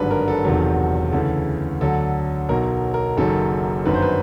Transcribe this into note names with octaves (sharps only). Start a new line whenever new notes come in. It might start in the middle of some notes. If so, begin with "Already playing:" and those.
Already playing: G#1 G2 D3 F#3 B4
A#4
A4
E1 E2 C3 D#3 F#3
D2 C#3 E3 A4
D2 D3 F#3 A4
B1 B2 F#3 A#4
A#4
F#1 F#2 D#3 F#3 A4
G1 F#2 D#3 B4
C5
B4